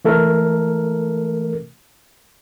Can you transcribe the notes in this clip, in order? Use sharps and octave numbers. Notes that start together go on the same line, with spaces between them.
E3 A3 A4 A#4